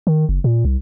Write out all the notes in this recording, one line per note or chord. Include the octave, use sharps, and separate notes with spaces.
D#3
F#1
A#2
C2